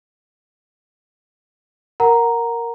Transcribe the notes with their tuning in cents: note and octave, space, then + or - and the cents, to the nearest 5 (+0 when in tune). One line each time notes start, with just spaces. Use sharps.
A#4 +0 F#5 +0 A#5 +0